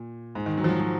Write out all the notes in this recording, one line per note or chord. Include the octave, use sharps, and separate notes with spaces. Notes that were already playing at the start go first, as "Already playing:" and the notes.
Already playing: A#2
G#2
D#3
F#3
F3
F#3
F#3